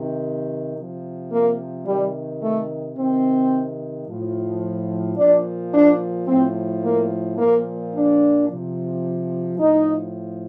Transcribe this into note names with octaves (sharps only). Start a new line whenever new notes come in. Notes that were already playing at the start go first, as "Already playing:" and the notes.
Already playing: C3 D#3
C3 F3
A#3
C3 D#3 G3
A3
C3 D#3 C4
A2 F3
A#2 F3 D4
D4
A2 F3 C4
A#3
A#2 F3 A#3
D4
C3 F3
A2 F3 D#4